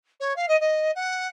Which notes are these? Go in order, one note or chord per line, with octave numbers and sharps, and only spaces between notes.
C#5
F5
D#5
D#5
F#5